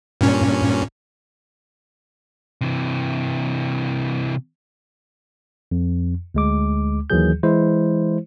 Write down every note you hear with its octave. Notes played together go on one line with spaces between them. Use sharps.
G2 A#2 C#4
C3 E3
F2
D2 G#3 D6
D#2 D#3 E3 F#3 G#4 G6
E3 G#3 E4 C5